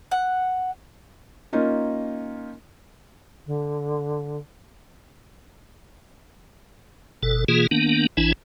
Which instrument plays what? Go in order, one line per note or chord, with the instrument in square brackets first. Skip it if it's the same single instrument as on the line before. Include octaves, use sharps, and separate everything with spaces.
[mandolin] F#5
[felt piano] A#3 C#4 D#4 F4
[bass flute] D3
[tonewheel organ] G1 B2 A4
B2 E3 A#3 F4 G#4
D#3 A#3 B3 D4
A1 E3 D4 E4 G#5